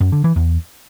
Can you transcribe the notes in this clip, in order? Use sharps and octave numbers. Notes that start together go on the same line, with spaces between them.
F#2
D3
E3
E2